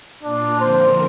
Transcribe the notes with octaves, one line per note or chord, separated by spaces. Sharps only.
A#2 A#3 D4 F4
D3 F3 C4 A#4 C5